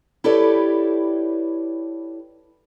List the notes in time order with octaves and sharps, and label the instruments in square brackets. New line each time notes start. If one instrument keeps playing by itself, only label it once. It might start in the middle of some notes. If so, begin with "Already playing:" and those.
[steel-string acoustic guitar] E4 G4 A4 B4 C#5 D5